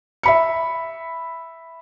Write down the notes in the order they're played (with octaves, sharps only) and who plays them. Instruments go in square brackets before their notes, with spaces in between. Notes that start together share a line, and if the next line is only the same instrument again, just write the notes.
[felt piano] E5 B5 C#7